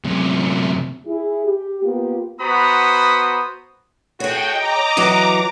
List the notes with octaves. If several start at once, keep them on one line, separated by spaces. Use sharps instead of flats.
F#2 C3
E4 G#4
G4
A#3 B3 F4 G4
B3 F#4 C5 A#5 B5 D#6
A2 F#4 G#4 C#5 G5
D#5 A#5 D6
E3 F#3 F#4